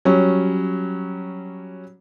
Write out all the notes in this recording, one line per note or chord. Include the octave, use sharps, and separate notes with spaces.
F#3 G3 C#4